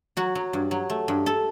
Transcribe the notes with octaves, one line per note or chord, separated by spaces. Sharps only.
F#3 F#4
F#3
G2
F#3
A3
G2
A4